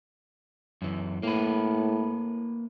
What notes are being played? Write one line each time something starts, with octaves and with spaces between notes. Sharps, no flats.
F#2 E3
A2 A#3 B4